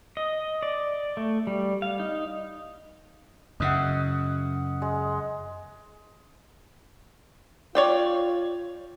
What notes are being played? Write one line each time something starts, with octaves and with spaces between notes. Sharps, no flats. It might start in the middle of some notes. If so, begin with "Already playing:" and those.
D#5
D5
A3
G3
F5
D#4
F#2 C#3 D#5 E5 F#5
G#3
F4 C#5 D5 G5